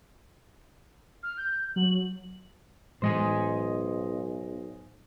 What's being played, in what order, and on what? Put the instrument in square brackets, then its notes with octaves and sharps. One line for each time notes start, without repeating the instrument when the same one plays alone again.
[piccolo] F6
G6
[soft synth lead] F#3 [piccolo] F#7
[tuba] B1 [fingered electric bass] A2 E3 G#3 [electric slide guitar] C5 D#5 G#5